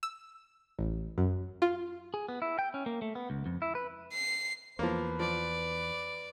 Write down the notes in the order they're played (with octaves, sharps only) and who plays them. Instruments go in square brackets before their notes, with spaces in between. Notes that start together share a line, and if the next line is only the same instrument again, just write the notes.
[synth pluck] E6
A1
F#2
F4
[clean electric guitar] G#4
B3
E4
G5
C#4
A#3
A3
B3
C#2
F2
E4
B4
[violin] C7
[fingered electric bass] E2 [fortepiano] F3 A#3 [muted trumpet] B4
[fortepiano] F3 [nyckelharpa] D5